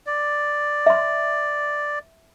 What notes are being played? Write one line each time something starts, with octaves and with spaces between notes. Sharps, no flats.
D5
E5 C6